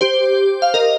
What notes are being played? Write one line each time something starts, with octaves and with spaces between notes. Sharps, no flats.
G4 C5
F5
A#4 D#5